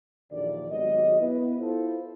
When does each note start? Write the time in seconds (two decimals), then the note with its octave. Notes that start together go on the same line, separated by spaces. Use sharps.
0.32 A#1 D#2 D3 E3 D4 D5
0.71 G#1 F#3 G#3 B3 G4 D#5
1.20 B3 E4 B4
1.60 E4 F4 A4 C5